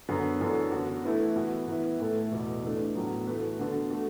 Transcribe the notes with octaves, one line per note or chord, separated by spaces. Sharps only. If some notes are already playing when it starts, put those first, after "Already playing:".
F#2 D3 B3
F#2 E3 D4 A4
D3 B3 F#4
E3 A3 E4 B4
E3 B3 F#4
E3 B3 E4 B4
A2 E3 A3 E4 A4
E2 B2 B3
E3 A3 D4
A2 F#3 B3
E3 A3 F#4 B4
D3 B3 F#4 A4
A3 F#4